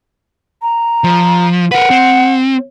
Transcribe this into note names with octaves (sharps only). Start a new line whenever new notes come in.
A#5
F3
A#4 B4 F#5
C4